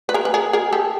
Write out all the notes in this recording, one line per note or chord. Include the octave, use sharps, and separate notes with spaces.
B4
G#4 A#4
B4
G#4 A#4
G#4 A#4
G4 A4